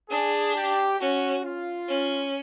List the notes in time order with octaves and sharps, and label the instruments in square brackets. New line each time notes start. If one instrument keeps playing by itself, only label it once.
[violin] D4 [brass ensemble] G#4
[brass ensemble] G4
[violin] C#4 [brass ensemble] F#4
[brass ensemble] F4
[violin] C#4